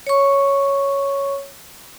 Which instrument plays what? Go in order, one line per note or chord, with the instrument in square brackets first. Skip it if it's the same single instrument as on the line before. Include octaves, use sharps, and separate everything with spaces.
[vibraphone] C#5 C#6